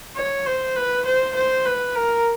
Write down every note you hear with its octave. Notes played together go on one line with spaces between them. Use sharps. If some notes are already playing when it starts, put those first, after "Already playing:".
C#5
C5
B4
C5
C5
B4
A#4